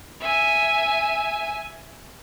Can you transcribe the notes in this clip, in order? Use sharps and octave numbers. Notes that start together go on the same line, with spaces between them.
E5 G#5